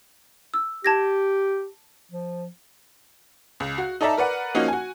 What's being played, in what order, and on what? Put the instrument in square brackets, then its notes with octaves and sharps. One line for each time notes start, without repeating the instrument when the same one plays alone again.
[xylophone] E6
[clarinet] G4 [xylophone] A5 G#6 A#6
[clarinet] F3
[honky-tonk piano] C#2
F#4
D#4 A4 D5 E5 A5 A#5
A#4 B4 D5 F#5
F3 A#3 C#4 D#4 F#4
F#4 G#5